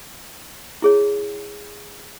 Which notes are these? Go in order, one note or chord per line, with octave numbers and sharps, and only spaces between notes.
E4 G#4 C#5